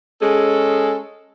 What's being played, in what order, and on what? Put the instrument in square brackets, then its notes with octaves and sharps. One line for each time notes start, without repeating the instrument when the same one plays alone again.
[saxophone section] G#3 C#4 G#4 A4